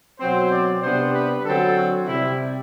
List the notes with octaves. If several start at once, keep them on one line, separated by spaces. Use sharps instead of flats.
B2 F#3 C4 C5
D5
C3 G3 B3 D4 C5
B4
D3 F#3 C4 A4
F#4
C3 G3 C4 E4